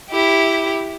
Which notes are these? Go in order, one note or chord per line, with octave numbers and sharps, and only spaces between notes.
E4 G4